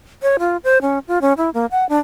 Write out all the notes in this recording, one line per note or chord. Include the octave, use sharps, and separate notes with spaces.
C#5
F4
C5
C#4
F4
C#4
E4
A#3
F#5
D4